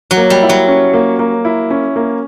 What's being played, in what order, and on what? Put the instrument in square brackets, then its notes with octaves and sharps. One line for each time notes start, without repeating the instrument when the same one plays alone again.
[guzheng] F#3
[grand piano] A#3
[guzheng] G3
[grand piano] E4
[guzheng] F#3
[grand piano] C#4
A#3
A#3
E4
C#4
A#3